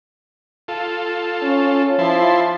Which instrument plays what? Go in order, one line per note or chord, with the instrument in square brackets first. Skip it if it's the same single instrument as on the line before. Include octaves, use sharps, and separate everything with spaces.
[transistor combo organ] F4 A4
[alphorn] C#4
[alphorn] F3 [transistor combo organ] E4 A5 C6